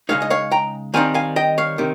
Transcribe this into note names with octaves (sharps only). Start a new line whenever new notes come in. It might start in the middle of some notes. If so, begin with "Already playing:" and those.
C#3 G#3 D#4 C#5 F5
D#5
C#5 F5
G5 A#5
D#3 G3 C4 D#4 F5 G#5
F5 G#5
D#5 G5
C#5 F5
C3 D#3